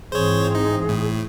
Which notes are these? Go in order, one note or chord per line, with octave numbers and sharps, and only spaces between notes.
G#2 E3 C4 G#4 C5 C#5
D#4
A2